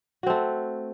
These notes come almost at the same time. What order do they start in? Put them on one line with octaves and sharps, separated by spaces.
F#4 C4 A3